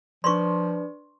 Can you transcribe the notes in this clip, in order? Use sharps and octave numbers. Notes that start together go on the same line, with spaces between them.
F3 D4 B4 D5 C6 C#6